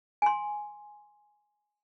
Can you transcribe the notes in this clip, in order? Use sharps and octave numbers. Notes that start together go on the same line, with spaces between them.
G#5 C6